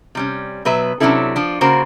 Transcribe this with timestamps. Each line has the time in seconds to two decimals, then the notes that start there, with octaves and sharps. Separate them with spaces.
0.15 C3 G3 C#4
0.65 B2 F#3 B4 E5
1.00 C3 F#3 C#4 D4 E4 A4
1.36 F3 D4
1.61 C#3 A#3 F#4 A#4 C5